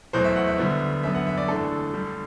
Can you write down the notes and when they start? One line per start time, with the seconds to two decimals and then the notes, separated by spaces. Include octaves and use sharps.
0.13 E2 B2 F#3 A3 C5
0.24 E5
0.36 F#5
0.47 E5
0.58 D2 D3 G3 B3
1.03 F#2 D3 F#3 B3 E5
1.15 F#5
1.27 E5
1.38 D5
1.48 E1 E2 D3 A3 A4
1.94 D2 D3 G3